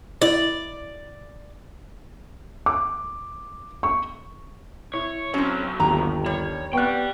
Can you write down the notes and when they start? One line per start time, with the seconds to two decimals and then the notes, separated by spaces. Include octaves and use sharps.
0.22 E4 D5 D#5
2.66 D6
3.83 C#6
4.94 E4 C#5
5.34 B1 F#3 C4 C#4
5.80 G1 D#2 A#5
6.26 G3 C#5
6.73 B3 D5 G5 C#6 F#6